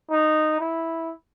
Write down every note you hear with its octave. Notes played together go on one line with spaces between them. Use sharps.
D#4
E4